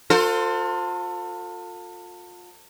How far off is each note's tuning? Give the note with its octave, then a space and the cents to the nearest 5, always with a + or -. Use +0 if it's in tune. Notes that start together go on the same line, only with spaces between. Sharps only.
F4 +35 A4 +35 C5 +0